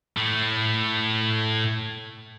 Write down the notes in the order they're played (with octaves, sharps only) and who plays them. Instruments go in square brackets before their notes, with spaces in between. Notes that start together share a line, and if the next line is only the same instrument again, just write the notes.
[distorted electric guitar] A2 A3